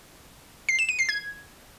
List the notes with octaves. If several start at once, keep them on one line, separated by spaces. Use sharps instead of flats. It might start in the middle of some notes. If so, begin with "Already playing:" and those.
C7
E7
D#7
C7
G#6